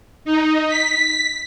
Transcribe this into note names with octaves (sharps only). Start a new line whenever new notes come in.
D#4
B6